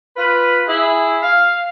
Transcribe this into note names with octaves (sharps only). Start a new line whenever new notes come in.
F4 B4
E4 G#4
F5